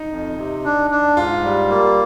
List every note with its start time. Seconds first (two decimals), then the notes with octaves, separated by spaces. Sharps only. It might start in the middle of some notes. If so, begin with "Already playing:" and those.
Already playing: D#4
0.11 F2
0.38 C3
0.65 D4
0.91 D4
1.17 G#2 F4
1.44 G3
1.70 A#3